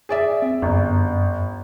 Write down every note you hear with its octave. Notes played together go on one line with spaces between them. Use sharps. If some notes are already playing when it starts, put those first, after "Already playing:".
G#4 D5 E5
C4
G1 F#2